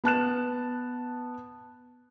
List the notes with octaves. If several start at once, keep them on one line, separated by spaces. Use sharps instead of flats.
B3 A5 F#6 E7